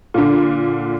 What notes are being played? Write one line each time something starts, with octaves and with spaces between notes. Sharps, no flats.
A#2 D3